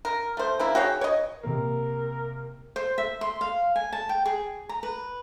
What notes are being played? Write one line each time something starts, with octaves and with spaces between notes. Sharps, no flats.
A#4
A3 C5
C#3 A#3 E4
F#4 G#4 C#5 G5
C#5 D#5
C3 A#3 A#4
C5
E5
C6
F5
G#5
A5
G5
G#4
A#5
B4